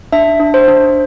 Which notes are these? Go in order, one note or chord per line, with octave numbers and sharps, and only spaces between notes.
D4 E5
D4
C5
D4